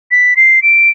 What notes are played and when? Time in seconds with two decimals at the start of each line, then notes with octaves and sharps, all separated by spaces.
0.11 B6
0.36 C7
0.62 D7